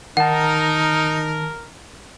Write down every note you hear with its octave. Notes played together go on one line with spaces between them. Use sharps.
D#3 D#4 A#4 F#5 A5